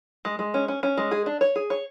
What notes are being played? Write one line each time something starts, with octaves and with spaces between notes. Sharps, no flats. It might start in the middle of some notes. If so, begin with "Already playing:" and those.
G#3
G#3
C#4
C#4
C#4
G#3
G#4
D4
C#5
G#4
C#5